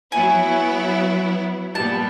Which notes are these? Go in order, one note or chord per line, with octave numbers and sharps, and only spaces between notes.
F#3 B3 E4 G#5
A#2 G3 B3 A5